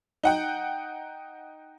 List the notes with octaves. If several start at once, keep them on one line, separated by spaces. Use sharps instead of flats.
D#4 F#5 G5